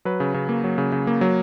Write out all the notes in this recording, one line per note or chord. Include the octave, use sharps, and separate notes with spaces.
F#3 B4
C#3
C#3
A#3
F#3
C#3
C#3
A#3
F#3